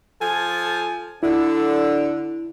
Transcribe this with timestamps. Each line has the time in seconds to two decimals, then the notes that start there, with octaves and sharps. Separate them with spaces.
0.21 F3 A4 G#5
1.23 D3 E4